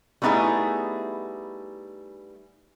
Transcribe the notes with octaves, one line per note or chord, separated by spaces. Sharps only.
G3 A3 B3 D#4 E4 G#4